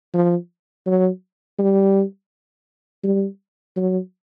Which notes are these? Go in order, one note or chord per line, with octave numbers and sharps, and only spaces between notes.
F3
F#3
G3
G3
F#3